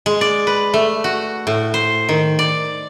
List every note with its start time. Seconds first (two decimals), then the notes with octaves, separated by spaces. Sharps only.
0.06 G#3
0.21 D5
0.47 B4
0.74 A3
1.04 F#4
1.47 A2
1.74 C5
2.09 D#3
2.39 D5